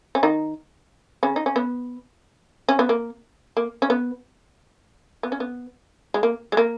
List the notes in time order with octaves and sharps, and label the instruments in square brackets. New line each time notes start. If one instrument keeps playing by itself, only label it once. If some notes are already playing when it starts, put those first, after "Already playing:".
[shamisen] C#4
D#3 D#4
C#3 C#4
D#4
C#4
B3
C#4
B3
A#3
A#3
C#4
B3
B3
C#4
B3
G#3
A#3
G#3
A#3